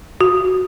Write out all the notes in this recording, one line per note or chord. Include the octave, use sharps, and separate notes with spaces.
F#4